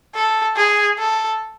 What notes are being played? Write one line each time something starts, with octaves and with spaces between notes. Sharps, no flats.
A4
G#4
A4